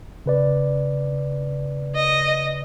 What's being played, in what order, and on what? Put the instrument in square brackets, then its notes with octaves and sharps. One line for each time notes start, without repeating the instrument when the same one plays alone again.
[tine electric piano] C#3 B4 D5
[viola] D#5